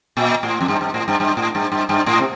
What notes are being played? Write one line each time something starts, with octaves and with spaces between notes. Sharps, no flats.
A#2
A2
F2
G2
G2
A2
G2
G2
A2
G2
G2
G2
A2
C3